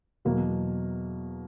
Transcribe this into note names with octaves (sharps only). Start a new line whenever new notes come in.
E2 B2 F#3 A#3